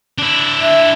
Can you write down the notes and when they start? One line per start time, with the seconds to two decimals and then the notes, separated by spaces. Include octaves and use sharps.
0.18 D4 E4
0.62 E5